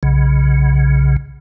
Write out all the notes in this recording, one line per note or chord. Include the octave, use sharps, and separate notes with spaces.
B1 C#3